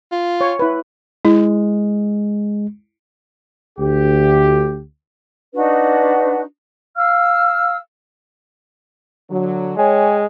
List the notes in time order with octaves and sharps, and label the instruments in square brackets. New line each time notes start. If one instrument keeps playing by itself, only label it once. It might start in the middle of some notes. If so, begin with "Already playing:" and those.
[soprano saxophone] F4
[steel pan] C#5
E4 B4
[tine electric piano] G#3 [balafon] E4
[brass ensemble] D2 G4
[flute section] D4 D#4 F#4 B4
F5 E6 F6
[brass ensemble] D3 F#3
[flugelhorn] G#3 [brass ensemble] C#5 G5 G#5